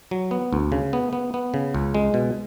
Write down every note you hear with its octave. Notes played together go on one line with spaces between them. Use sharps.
F#3
B3
D2
C#3
B3
B3
B3
C#3
C#2
G#3
B2